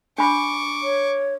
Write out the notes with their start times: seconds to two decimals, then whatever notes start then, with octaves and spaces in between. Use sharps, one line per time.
0.18 D4 B5 C#6 D6
0.83 C#5